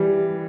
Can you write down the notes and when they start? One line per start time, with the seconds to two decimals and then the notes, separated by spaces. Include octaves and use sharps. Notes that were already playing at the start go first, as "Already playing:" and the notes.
Already playing: E3 G3